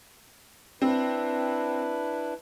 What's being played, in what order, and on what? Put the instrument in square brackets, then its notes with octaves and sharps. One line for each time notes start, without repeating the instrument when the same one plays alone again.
[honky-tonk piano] C4 [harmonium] D4 E4 B4